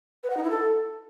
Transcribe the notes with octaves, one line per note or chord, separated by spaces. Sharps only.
B4
F#5
D#4
E4
A4